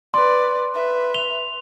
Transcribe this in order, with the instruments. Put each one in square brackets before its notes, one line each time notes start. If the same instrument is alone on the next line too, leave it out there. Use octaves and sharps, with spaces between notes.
[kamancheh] B4 D5 [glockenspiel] C6
[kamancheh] B4 E5
[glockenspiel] F7 G7